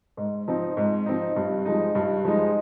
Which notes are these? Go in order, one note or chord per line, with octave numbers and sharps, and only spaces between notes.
G#2
F3 C4 D#4
G#2
F3 C4 D#4
G2
F3 G#3 D#4
G2
F3 G#3 D#4